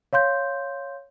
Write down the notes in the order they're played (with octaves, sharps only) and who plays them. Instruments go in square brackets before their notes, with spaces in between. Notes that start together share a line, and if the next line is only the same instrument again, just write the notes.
[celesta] C#5 F5 C6 G6